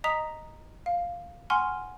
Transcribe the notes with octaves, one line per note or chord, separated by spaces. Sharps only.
D#5 A#5 D#6 B6 F7
F5
F#5 G#5 C6 C#6 F6